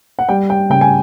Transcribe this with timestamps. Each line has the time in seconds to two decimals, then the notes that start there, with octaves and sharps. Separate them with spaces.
0.19 F#5
0.29 G3 G5
0.50 G5
0.70 C#3 G5
0.81 G#5